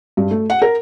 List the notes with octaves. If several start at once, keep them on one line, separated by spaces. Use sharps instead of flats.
G2
A3
F#5
A#4